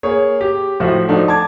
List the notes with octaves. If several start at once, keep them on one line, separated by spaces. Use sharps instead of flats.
A#3 G#4 C#5
G4
A2 F3 F#4 E5 F#5
F3 A3 D4 D#4 F#4
A5 D6 G#6